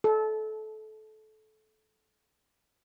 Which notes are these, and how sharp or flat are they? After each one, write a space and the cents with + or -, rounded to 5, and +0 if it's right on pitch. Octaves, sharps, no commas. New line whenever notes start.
A4 -20